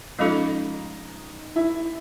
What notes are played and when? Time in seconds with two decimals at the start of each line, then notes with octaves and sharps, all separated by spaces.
0.19 F3 G#3 C#4 D#4 F4 A4 D#5
1.55 E4 E5